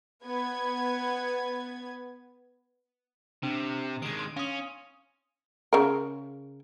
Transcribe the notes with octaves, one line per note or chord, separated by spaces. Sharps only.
B3 B4 G#6
C3 D4
D#3 G#3 D7 D#7
C6
C#4 F5 D#6
C#3 A#4